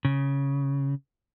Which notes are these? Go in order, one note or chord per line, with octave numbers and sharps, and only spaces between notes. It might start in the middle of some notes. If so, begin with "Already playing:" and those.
C#3